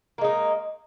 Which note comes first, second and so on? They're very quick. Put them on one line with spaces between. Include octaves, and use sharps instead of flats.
A#3 G#3 D#4